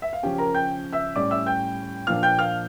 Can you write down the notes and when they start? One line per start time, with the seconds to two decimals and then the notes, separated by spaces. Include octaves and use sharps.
0.02 E5
0.13 F5
0.23 C#3 F3 C#4 G4 G5
0.38 A#4 A#5
0.54 G5 G6
0.93 E5 E6
1.15 A2 G3 C#4 D5 D6
1.30 E5 E6
1.46 G5 G6
2.07 A#2 F3 A#3 D4 F5 F6
2.23 G5 G6
2.39 F5 F6